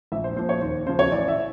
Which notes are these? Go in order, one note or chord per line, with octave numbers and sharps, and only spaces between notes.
A#1 E5
C5
A#2 F3 C5
C#5
D#2 C5
C#3 F3 C5
C#5
A1 D5
E5